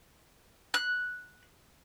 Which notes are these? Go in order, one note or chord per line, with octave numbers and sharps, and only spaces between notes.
F#6